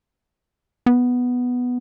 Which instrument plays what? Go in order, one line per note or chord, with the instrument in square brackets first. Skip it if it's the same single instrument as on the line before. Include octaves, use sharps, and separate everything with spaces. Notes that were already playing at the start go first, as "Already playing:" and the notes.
[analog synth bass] B3